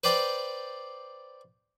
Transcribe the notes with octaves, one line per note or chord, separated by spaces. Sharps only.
B4 C5 D5 G5